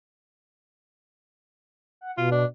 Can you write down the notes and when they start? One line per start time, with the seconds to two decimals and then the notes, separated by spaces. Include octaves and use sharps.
2.01 F#5
2.18 B2 F4
2.32 D4